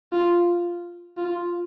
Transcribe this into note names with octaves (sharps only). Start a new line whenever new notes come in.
F4
F4